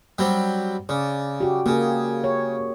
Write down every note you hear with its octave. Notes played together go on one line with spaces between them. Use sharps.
F#3 G3 C4
C#3 D5
F#4 G4
C#3 A#3 G#4
C#5